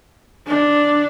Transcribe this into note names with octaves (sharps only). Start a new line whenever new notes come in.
D4